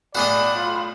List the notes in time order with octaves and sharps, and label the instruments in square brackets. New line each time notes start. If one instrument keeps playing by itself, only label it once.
[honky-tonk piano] B1 A2 [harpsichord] F#4 G#4 D#5 [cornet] D5 [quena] B5
[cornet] F4